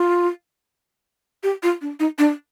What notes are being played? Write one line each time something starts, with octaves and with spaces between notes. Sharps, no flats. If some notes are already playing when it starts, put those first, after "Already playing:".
Already playing: F4
G4
F4
D4
D#4
D4